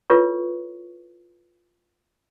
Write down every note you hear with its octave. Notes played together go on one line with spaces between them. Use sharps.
E4 F4 A4 B4 C#5 C#6